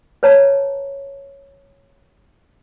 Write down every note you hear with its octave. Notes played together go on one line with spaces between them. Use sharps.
B4 C#5 A5 A#5